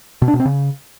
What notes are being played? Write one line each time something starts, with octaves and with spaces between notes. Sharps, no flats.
B2
D4
B2
C4
C#3